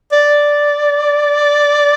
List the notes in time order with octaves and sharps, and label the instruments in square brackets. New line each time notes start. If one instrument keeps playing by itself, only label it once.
[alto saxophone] D5